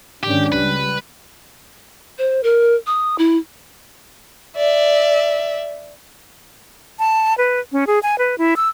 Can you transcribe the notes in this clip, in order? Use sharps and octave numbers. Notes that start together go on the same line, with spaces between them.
G#2 D#3 C#4 D4 G4
C#2 G3 B4
C5
A#4
D#6
E4
D5 E5
A5
B4
C#4
G#4
G#5
B4
E4
E6